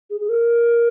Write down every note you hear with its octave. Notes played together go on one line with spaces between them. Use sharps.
G#4
G#4
A#4